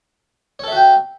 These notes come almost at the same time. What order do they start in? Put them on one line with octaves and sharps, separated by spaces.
C#5 A4 E5 F#4 G5